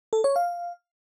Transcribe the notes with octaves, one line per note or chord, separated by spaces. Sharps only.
A4
C#5
F5